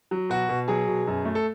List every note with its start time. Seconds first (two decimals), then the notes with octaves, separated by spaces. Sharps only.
0.11 F#3
0.30 B2 F#4
0.49 B2
0.68 F#3 G#4
0.88 B2
1.07 F#2
1.25 A3
1.35 A4